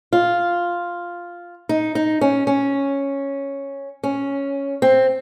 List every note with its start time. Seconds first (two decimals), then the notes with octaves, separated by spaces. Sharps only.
0.13 F4
1.69 D#4
1.95 D#4
2.21 C#4
2.47 C#4
4.03 C#4
4.82 C4